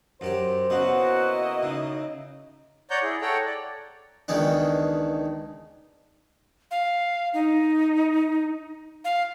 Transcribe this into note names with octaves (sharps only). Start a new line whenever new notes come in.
F#2 G4 C5
C#3 A#3 B3 E4 F#4 D#5
C#3 D#4
C#5 D5 F#5 A#5 G6
E4 G#4
A4 C#5 F#5 G5 A#5
D5
C#2 D#3 E3 B3 D4
F5
D#4
F5